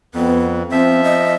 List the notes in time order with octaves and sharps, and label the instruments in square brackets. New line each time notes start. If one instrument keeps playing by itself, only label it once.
[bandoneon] F2 [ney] B3
[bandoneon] F3 E5 [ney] C4
[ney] D#5